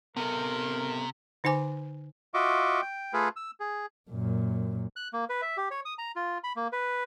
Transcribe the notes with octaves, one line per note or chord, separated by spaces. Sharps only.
C3 B3 A4 A#4
D3 D#4 C5 G#5 D6
F4 F#4 D#5 E5 C#6 D6
G5
A3 F4 G#4 A4 B4 F5
E6
G#4
F#2 A#2
F#6
A#3
B4
E5
G4
C#5
D#6
A#5
F4
B5
A#3
B4